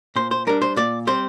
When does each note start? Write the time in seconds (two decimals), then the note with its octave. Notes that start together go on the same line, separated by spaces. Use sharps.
0.16 A#2 C5
0.31 C5
0.47 G3 D4 A#4
0.62 C5
0.76 A#2 D5
1.07 G3 C4 C5